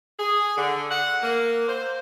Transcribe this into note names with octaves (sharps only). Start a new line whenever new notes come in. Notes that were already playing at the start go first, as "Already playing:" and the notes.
G#4
D3
F#5
A#3
C5